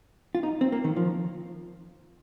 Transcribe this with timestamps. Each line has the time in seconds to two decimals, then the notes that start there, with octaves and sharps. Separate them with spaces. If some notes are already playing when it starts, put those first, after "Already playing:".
0.35 F4
0.43 D#4
0.61 C4
0.72 A#3
0.84 D#3
0.97 F3